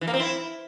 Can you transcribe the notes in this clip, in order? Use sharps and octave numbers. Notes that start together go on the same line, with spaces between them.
E3
A#3
C4
E4